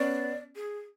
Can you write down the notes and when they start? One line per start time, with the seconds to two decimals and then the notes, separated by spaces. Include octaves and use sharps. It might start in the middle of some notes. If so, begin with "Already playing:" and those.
Already playing: B3 C#4 D5
0.56 G#4